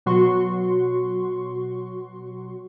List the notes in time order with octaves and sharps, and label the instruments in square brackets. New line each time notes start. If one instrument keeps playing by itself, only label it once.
[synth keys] B2 F#3 F#4 C6 C#6